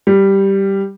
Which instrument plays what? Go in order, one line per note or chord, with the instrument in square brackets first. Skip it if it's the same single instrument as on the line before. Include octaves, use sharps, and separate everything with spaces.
[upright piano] G3